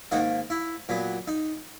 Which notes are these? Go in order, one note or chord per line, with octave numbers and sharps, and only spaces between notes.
G#2 D#3 A#3 D#4 F#4
E4
A#2 F#3 B3
D#4